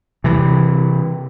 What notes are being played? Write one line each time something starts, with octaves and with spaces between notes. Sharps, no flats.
C3 E3